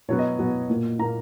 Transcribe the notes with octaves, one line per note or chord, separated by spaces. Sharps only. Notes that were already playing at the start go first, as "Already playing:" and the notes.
B2 F#3 B3 C#5
D#5
B2 F#3 B3
A#2 A#3
A#2 A#3 A#5